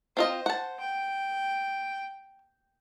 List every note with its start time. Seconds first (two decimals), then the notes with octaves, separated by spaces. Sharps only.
0.17 C4 F4 C5 D#5
0.46 F#5 A5
0.80 G5